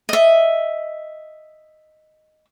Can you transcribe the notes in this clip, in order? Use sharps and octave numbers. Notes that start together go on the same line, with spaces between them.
D#5 E5